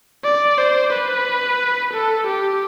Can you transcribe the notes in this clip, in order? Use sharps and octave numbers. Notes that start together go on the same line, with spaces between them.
D5
C5
B4
A4
G4